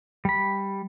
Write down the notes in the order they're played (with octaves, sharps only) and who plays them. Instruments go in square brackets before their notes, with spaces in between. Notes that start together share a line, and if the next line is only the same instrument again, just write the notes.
[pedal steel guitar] G3 B5